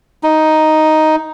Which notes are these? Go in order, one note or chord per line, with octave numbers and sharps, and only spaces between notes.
D#4